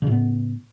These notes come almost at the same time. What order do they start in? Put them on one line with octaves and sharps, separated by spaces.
C#3 A2 B3